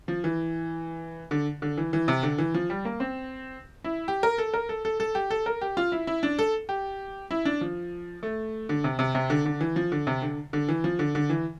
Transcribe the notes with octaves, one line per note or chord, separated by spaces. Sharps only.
F3
E3
D3
D3
E3
E3
C3
D3
E3
F3
G3
A#3
C4
E4
G4
A#4
A4
A#4
A4
A4
A4
G4
A4
A#4
G4
F4
E4
E4
D4
A4
G4
E4
D4
F3
A3
D3
C3
C3
C3
D3
D3
E3
F3
D3
C3
D3
D3
E3
F3
D3
D3
E3